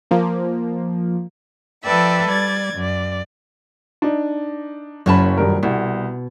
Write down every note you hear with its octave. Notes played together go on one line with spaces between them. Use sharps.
F3 A#3
F3 A4 B4 D5 E5 G5
G3 D5 G#6 A6
F#2 D5
D4 D#4
F#1 F#2 C#4 C#5 A5 B5
D#1 G2 A#4
C2 B2